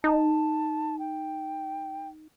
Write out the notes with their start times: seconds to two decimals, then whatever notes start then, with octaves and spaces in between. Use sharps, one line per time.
0.04 D#4 A5
0.99 G5